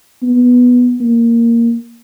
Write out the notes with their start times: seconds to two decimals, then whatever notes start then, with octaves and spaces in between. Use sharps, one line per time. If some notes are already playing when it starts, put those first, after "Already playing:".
0.23 B3
1.00 A#3